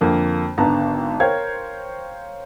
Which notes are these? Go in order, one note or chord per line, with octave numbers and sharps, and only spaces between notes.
F2 D3 A#3
G#1 D3 B3 A5 A#5
A#4 C5 C#5 F5 G5 G#6